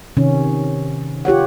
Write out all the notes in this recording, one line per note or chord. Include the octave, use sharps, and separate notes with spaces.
C3 D#3 C#4
F4 G4 C#5 F#5